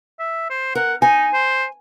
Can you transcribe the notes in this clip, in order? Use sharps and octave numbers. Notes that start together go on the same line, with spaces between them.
E5
C5
A#4 F#5
D#4 G#5
C5